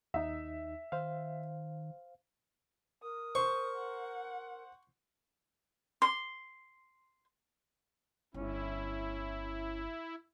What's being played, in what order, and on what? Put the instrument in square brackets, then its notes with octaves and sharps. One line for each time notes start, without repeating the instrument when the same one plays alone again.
[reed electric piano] D#2 D#4 [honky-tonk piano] E5
[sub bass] D#3 [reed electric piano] C5 F5
[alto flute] A#4 [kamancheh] D#6
[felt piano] C5 C6 [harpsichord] C#6
[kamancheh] F#5
[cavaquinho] C6
[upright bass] G1 [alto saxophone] C#4 [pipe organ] E4